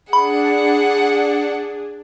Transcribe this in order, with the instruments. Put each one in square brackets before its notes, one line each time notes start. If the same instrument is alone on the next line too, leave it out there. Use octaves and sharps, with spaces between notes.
[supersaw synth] D4 [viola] G#4 [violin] F#5 [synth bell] B5